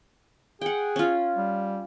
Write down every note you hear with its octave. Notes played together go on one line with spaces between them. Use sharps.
G#4 F#5 G5
C#4 F4
G3